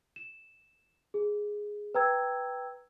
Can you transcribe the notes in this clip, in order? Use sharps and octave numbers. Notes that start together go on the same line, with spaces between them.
E7
G#4
B4 G5 A#5 E6 G#6